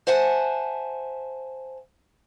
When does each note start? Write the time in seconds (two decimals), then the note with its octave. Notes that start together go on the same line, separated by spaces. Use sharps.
0.07 C5 E5 F#5 G#5 A5